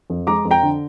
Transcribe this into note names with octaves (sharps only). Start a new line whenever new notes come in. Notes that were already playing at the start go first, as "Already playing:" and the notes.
F2
G#3 A#5 D6
F2
G5 A#5
D3